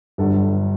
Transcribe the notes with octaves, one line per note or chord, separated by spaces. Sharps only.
G1 G2 F#3 F#4 A4